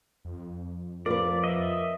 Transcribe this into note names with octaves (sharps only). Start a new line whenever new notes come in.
F2
F3 A#4 B4 D5
D#5 E5